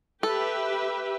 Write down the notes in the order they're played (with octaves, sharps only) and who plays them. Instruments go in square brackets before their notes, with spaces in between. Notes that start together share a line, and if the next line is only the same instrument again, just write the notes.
[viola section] G4 B4 E5 [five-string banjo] A4